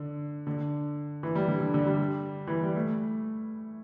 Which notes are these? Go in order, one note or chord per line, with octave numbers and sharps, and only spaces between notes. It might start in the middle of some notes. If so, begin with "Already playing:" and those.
Already playing: D3
D3
E3
G3
D3
D3
D3
G3
E3
G3
A3